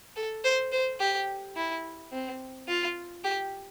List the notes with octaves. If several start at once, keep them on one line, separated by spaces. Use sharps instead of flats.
A4
C5
C5
G4
E4
C4
F4
G4